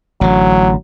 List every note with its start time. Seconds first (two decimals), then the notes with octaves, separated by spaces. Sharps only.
0.21 A1 D3 F#3